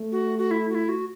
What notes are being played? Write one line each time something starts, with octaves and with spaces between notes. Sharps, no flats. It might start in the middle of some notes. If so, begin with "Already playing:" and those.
Already playing: A3
F#4
F#4
E4
F#4
E4
F#4